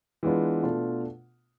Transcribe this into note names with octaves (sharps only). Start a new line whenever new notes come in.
E3 G#3 B3 D4 F4
B2 A3 D4 F4